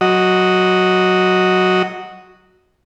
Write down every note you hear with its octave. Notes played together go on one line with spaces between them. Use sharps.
F#3 F#4 D#5